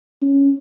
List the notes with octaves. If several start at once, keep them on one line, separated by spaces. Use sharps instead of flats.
C#4